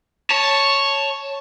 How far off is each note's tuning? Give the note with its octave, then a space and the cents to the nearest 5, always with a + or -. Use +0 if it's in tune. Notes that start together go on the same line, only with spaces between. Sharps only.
C#5 +0 A5 +0